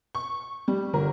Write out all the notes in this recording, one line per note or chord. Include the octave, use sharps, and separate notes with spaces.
C#6
G3
G1 A#4